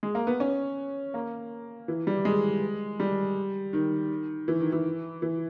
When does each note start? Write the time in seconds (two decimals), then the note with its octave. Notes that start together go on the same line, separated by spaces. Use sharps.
0.03 G#3
0.15 A#3
0.27 B3
0.40 C#4
1.14 A#3
1.88 E3
2.07 G3
2.25 G#3
3.00 G3
3.73 D#3
4.48 E3
4.60 D#3
4.72 E3
5.22 E3